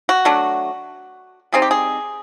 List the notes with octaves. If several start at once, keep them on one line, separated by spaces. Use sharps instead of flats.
F#4
F#3 A3 D4
G3 C4 D#4 G#4
G4
G#4